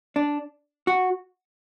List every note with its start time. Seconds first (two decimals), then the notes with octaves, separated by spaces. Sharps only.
0.16 D4
0.87 F#4